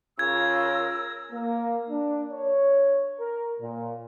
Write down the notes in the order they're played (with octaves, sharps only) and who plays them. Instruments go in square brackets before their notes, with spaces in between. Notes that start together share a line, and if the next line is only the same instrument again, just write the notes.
[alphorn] C#3 [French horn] F4 [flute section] A#4 C#5 E6 [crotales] G#6
[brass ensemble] A#3
D4
C#5
A#4
A#2